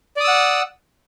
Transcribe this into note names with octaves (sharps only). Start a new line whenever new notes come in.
D5 F#5 D#6 E6